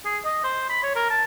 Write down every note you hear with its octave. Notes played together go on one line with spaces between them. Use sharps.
G#4
D#5
C5
B5
C#5
A#4
A5